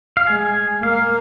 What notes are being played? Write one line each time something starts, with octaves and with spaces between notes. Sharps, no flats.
F5
G#3 G#5
A#3 F5